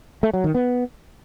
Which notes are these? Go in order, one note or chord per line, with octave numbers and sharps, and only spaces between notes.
A3
F#3
D#3
B3